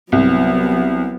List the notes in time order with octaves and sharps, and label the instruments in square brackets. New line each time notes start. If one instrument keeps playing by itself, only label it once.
[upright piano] C2 [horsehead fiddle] F#3 B3